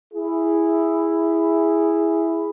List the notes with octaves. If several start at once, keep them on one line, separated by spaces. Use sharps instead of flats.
E4 G#4